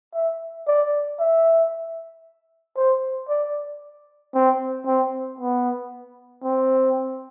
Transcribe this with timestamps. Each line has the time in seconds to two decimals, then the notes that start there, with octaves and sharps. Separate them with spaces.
0.14 E5
0.67 D5
1.20 E5
2.77 C5
3.29 D5
4.34 C4
4.86 C4
5.39 B3
6.44 C4